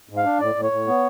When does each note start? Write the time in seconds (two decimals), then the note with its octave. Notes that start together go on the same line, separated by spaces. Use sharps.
0.09 G#2
0.17 F5
0.25 D4
0.40 A2 D5
0.55 A2
0.63 C#5
0.72 A2
0.87 B3